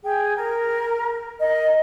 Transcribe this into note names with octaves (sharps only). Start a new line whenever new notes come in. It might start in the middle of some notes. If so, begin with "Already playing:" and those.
G#4 G5
A#4
A#4 D#5